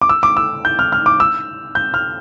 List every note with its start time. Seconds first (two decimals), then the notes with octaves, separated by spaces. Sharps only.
0.02 D6
0.09 E6
0.23 D6
0.37 E6
0.65 G6
0.79 F6
0.92 F6
1.06 D6
1.20 E6
1.75 G6
1.94 F6